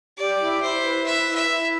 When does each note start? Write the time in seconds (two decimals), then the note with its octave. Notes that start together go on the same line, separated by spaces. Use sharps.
0.17 G4 D5
0.39 E4
0.62 E4 C5
0.83 B4
1.06 B4 E5
1.28 E4
1.35 E5
1.49 E4